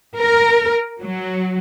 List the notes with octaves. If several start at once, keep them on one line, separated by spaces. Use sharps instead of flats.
A#4
F#3